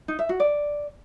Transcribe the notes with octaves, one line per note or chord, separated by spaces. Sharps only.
D#4
E5
F#4
D5